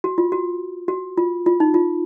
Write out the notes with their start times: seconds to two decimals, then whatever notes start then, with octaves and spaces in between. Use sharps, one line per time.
0.04 F#4
0.18 F4
0.32 F#4
0.88 F#4
1.17 F4
1.46 F4
1.60 D#4
1.74 F4